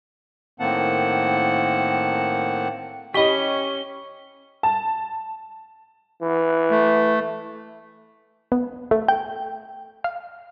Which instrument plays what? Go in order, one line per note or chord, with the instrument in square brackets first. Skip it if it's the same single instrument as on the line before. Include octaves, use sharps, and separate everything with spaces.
[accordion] A2 D#3 A#3 C4 F#5 A5
[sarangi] C#4 [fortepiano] G4 B5 [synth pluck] D#5 B6 [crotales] C#6 G7
[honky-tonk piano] A5
[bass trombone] E3
[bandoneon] A3
[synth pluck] B3
A3
G5
F5